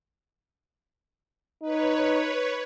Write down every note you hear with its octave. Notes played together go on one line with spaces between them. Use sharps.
D#4 B4 C#5